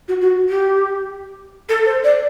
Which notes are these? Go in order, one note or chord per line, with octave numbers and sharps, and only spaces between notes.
F#4
F#4
G4
A4
C5
D5